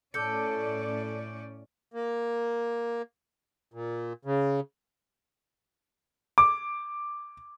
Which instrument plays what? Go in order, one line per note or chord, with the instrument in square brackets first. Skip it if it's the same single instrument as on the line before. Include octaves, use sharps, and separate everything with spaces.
[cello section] A2 C#4 D5 [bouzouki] A4 [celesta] D6 G6 C#7
[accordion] A#3
A#2
C#3
[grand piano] D6